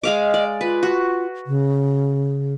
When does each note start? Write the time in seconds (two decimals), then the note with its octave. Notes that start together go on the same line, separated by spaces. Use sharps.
0.03 G#3 D#5 F5 D6
0.34 D5
0.61 F4 B4
0.83 F#4
1.47 C#3